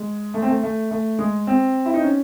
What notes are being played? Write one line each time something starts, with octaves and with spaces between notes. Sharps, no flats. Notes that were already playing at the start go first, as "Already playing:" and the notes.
Already playing: G#3
A3
C4
A3
A3
A3
G#3
C4
E4
D#4
C#4